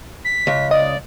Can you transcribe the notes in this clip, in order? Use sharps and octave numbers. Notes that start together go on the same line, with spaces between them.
B6
C#2
D5 D#5